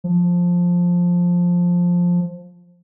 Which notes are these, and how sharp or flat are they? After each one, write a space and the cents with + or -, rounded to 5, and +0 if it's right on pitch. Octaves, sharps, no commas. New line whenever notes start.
F3 +10